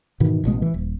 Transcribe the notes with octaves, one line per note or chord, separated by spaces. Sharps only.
G#2 B2 D#3 E3
A1 B2 F#3 G#3
E3
D#1